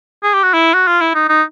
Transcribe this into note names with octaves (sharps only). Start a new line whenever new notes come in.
G#4
G4
F#4
E4
F#4
F4
E4
D#4
D#4